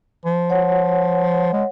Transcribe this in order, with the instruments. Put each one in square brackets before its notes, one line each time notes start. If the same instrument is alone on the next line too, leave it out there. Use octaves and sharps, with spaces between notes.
[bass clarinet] F3
[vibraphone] C#5 F#5
[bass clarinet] G#3